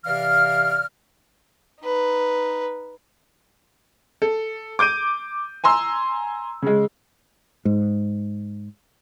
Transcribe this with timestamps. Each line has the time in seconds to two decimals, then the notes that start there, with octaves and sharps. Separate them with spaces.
0.06 C3 E3 D5 F5 F6
1.82 D#4 B4
4.22 A4
4.79 D6 G6 D7 D#7
5.64 G#5 A#5 C6 E6
6.62 C#3 G#3
7.65 G#2